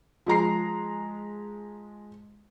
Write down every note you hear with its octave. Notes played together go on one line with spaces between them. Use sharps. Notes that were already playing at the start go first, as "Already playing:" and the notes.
F3 G#3 A#5 C7